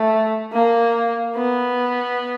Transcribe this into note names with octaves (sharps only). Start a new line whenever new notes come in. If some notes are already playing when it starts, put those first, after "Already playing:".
Already playing: A3
A#3
B3